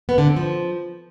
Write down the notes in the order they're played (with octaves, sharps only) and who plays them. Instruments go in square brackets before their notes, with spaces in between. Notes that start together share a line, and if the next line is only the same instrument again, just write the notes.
[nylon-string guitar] B3
D3
C4
F3